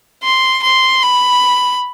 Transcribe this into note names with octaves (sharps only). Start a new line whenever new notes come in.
C6
C6
B5